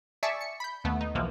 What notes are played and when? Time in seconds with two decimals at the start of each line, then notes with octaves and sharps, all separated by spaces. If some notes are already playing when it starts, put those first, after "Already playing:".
0.23 G#4 D5 E5 A5 C#6
0.41 C#7
0.60 B5 G6
0.84 D#2 A3 B3
1.01 D#4
1.15 B1 B2 E3 F3 A#3